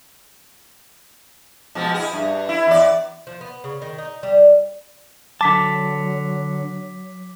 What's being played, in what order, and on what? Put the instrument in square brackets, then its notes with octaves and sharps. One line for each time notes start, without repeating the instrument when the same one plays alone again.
[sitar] B2 F3 G#3
E4 G#4
G2
E4
E2 D5
[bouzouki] F3
B3
C#3
D#3
D#4
G3
[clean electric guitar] D3 A5 [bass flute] F#3 [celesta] D6 B6